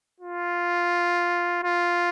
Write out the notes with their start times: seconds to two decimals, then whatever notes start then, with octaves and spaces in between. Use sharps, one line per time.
0.20 F4
1.64 F4